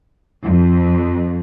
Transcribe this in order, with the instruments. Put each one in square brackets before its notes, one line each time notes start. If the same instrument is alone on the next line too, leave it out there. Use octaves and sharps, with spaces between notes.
[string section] F2